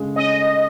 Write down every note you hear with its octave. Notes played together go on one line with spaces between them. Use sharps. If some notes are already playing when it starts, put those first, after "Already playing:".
Already playing: C#3 G#3
C#4 D#5